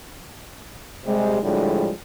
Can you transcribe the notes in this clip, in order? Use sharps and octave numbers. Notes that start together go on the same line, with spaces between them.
C3 G3 G#3
A2 D3 F3 G3 G#3